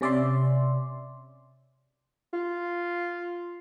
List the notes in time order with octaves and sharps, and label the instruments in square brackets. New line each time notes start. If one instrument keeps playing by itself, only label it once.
[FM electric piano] C3 C#4 D5 E5 C6
[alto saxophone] F4